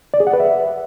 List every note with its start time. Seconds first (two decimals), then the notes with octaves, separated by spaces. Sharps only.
0.14 D5
0.20 G#4
0.27 F#5
0.33 B4
0.40 E5